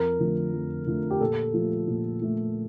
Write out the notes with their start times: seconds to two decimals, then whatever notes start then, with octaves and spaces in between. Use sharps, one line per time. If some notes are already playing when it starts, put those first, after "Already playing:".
Already playing: F2 A#4
0.19 D3 F3 A3
0.54 F2
0.87 D3 F3 A3
1.11 G4
1.21 A#2 A4
1.54 F3 A3
1.88 A#2
2.21 F3 A3